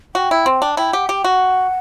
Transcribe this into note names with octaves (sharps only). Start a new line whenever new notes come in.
F#4 G5
E4
C4
D4
E4 G5
G4 F#5
G4 G5
F#4 F#5